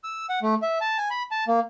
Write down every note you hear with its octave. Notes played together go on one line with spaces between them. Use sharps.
E6
F#5
A3
E5
A5
G#5
B5
A5
A#3